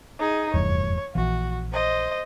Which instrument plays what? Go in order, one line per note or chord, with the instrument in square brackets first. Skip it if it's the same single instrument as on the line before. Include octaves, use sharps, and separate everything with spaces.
[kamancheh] D#4 G#4
[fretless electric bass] F1 E2 G2 [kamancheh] C#5
[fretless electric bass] A#1 E3 [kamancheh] F#4
[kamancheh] C5 D#5